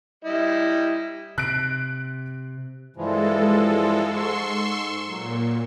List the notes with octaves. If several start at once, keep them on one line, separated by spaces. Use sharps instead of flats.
G3 E4 D#5
C3 F#6 D7
G2 E3 F3 G#3 A4
G#2 C6 C#6 E6
A#2 F#3